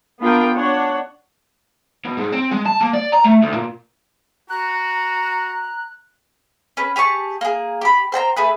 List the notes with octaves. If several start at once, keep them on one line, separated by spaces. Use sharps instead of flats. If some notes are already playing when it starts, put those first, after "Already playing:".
B3 D4 F4 A#4 F5 G5
D4 C#5 F#5
B2
G#2
C4
G#3
A5
A#3
D5
A#5
A3
D2
A#2
F#4 A#5 F#6
C#4 B4
G4 G#4 A5 C#6
A#3 G#4
G4 B5
C5 G5 A5 A#5
A3 G#4 B4